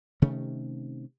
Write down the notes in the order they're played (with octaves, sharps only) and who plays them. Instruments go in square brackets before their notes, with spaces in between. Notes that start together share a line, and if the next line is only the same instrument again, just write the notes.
[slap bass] C3 D#3 A3 C#4